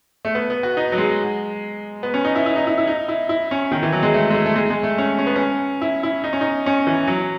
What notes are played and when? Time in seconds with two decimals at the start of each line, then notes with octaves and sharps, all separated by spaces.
0.25 A3
0.35 B3
0.50 B3
0.63 F#4
0.77 D#4
0.92 F#3
0.98 G#3
2.03 B3
2.14 C#4
2.25 D#4
2.35 E4
2.46 E4
2.56 D#4
2.67 E4
2.78 E4
2.88 D#4
3.08 E4
3.29 E4
3.51 C#4
3.71 D#3
3.83 E3
3.92 F#3
4.03 G#3
4.14 A3
4.31 G#3
4.34 A3
4.46 A3
4.56 G#3
4.70 G#3
4.83 A3
4.98 C#4
5.18 C#4
5.27 B3
5.36 C#4
5.82 E4
6.03 E4
6.24 D#4
6.33 C#4
6.41 D#4
6.66 C#4
6.87 E3
7.07 F#3